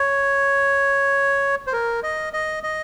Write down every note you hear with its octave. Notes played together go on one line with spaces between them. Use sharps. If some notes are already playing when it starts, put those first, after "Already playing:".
Already playing: C#5
C5
A#4
D#5
D#5
D#5